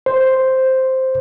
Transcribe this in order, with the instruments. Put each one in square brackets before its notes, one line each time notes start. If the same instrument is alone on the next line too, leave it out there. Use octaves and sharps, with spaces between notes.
[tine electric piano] C5